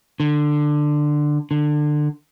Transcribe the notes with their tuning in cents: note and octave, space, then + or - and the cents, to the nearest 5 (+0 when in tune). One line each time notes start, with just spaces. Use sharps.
D3 +15
D3 +25